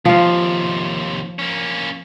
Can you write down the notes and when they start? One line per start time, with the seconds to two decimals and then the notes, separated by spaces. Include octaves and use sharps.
0.05 D#2 C3 F3 F4
1.39 A#3 C#4